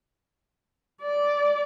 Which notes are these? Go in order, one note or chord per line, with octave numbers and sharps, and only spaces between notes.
D5